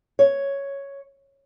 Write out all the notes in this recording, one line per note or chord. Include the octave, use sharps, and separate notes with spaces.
C#5